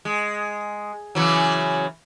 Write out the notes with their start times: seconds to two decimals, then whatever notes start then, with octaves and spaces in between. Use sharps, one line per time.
0.05 G#3
1.15 C#3 E3 F#3